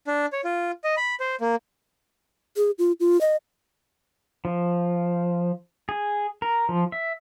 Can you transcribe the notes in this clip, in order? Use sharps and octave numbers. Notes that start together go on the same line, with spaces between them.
D4
C#5
F4
D#5
B5
C5
A#3
G#4
F4
F4
D#5
F3
G#4
A#4
F3
E5